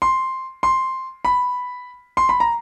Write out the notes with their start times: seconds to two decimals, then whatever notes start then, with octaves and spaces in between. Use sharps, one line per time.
0.02 C6
0.63 C6
1.25 B5
2.17 C6
2.29 B5
2.40 A#5